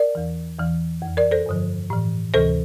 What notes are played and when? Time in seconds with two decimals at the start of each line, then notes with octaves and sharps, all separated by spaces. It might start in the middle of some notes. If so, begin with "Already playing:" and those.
Already playing: A#4 D5
0.15 E2 E3
0.59 E2 E3
1.02 F2
1.07 E3
1.17 A#4 D5
1.31 A4 C5
1.46 G2 D3 F3
1.90 A2 E3
2.34 D2 C3 E3 A4 C5